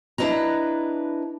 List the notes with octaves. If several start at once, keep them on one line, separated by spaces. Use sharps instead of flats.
D4 E4 B4 D#5 A#5